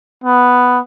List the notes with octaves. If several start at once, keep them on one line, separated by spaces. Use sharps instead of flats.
B3